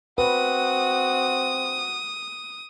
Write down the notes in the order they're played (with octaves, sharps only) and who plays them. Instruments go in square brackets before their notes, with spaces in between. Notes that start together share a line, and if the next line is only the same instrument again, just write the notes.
[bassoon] C4 [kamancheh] F#4 [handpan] B4 [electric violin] D#6